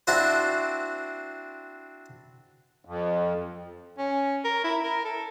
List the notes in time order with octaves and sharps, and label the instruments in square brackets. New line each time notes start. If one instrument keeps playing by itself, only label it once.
[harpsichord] C4 D4 E4 F#4 C5
[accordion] F2
[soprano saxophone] C#4
A#4
E4
A#4
A4